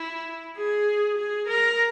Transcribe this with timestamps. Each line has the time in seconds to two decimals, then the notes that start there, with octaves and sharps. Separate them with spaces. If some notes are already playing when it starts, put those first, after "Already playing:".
Already playing: E4
0.57 G#4
1.17 G#4
1.47 A#4